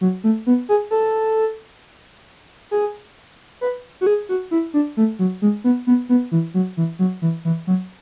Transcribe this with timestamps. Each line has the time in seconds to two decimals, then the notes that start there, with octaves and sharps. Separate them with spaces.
0.01 F#3
0.24 A3
0.47 B3
0.69 G#4
0.91 A4
2.71 G#4
3.61 B4
4.01 F#4
4.07 G#4
4.29 F#4
4.51 E4
4.74 D4
4.97 A3
5.19 F#3
5.42 G#3
5.64 B3
5.87 B3
6.09 B3
6.32 E3
6.54 F#3
6.77 E3
6.99 F#3
7.22 E3
7.45 E3
7.67 F#3